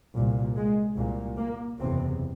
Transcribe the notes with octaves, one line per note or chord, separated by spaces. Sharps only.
C2 A#2
G#3
C2 A#2
A#3
F#1 E2 C3 C4